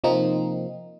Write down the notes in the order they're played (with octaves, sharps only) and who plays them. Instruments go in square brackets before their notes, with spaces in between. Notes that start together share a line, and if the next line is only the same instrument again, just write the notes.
[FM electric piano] C3 F3 A#3 C4 D#4